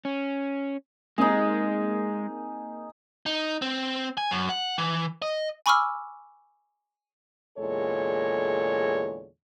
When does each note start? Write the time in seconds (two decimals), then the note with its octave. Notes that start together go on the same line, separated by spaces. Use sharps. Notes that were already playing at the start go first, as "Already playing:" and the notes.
0.05 C#4
1.18 G#3 A#3 C4 D#4 G#4
3.26 D#4
3.62 C4
4.17 G#5
4.31 F#2
4.49 F#5
4.78 E3
5.22 D#5
5.66 G#5 B5 C#6 D6 E6 F6
7.58 E2 A#2 D3 G#3 A4 C#5